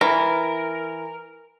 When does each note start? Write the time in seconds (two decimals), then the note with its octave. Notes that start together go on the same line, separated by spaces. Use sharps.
0.01 E3 A#4